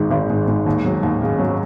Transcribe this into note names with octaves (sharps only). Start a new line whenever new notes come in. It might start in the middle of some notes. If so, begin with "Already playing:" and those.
Already playing: G#1 G#2 D#3
G#1
G#2
G#2
D#2
F#3
D#2
C#3
F#3